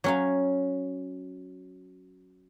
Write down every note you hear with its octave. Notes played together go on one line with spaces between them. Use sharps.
F#3 C#4 F5